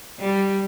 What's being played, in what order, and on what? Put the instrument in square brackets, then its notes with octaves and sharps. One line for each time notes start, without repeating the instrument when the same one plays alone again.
[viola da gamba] G3